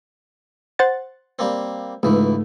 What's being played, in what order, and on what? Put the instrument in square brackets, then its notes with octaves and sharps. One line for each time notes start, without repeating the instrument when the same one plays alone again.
[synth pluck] C5 F#5 A6
[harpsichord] G3 A#3 C4
[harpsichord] C#2 E3 [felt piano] G#2 A3